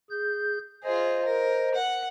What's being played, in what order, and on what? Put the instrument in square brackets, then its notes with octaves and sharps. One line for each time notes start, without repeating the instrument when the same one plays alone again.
[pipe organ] G#4 G6
[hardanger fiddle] F4 G#4 [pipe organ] C5 D#5
[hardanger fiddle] A#4
F#5